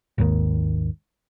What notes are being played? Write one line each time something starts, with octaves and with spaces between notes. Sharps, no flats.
G#1 D#2 D#3